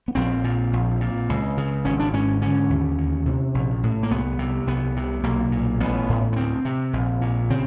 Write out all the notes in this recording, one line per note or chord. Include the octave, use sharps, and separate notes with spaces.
B3
A#1 C4
A#2
A#1
A#2
C#2
C#3
G#1 C#4
D4
G#2 C#4
D3 C#4
D#2
D2
C3
A#1
A2
A#3
C2 B3
C3
C2 B3
C3
B1 A#3
A#2
A1 B3
A2
B3
D2 C4
C3
A#1
A#2
C#3 C4